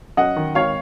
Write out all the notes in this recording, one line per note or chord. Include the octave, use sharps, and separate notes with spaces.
F#2 D#5 F#5
D#3
G#1 C#5 F5